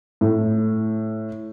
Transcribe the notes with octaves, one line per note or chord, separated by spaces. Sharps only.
A2